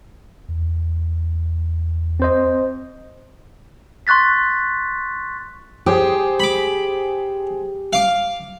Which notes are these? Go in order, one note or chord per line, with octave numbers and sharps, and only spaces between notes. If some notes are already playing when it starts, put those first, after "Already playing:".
E2
C4 C5 D#5
C6 C#6 F#6 A6 B6
G4 G#4 C5 D#6
B5 D6
F5 D6